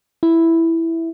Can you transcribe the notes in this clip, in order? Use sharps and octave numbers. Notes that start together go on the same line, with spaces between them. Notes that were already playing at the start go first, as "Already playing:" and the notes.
E4